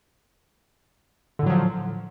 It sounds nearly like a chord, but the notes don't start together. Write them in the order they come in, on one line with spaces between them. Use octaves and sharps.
D3 A2 F#3 F3